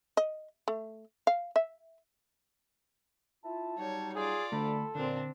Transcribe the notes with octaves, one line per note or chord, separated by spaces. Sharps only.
D#5
A3
F5
E5
E4 F4 A5
F#3 G3 D#4 C#5
F4 G#4 D5
D2 D3 A3 A4 B5
A#2 D3 C4 D4